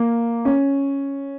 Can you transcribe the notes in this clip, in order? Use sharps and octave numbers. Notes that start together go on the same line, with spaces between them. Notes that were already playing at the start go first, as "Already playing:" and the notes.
Already playing: A#3
C#4